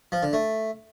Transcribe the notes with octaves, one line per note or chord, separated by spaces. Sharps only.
F3
D3
A3